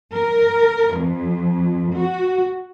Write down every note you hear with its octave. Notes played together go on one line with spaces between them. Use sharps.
A#4
F2
F#4